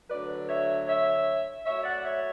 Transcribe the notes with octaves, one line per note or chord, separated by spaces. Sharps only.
D2 D3 F#3 B4 D5
C#5 E5
C#5 E5
A2 F#3 C#5 E5
D5 F#5
C#5 E5